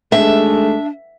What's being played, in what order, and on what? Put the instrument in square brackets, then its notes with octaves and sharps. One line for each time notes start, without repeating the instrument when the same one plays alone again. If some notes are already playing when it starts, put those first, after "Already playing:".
[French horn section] D#2 G#3 A3 [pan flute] D4 [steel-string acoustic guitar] E5